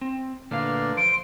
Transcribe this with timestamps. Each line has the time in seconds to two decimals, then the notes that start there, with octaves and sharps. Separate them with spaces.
0.01 C4
0.51 A#2 D3 A3 B4 F5
0.97 F3 C5 D7